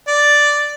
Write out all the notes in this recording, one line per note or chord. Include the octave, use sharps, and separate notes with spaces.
D5